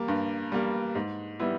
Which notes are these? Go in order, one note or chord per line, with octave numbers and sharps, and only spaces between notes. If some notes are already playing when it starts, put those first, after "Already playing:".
Already playing: G3 A#3
G2
G3 A#3
G#2
G3 B3 E4